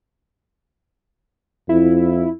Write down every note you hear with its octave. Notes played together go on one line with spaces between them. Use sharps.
F2 E4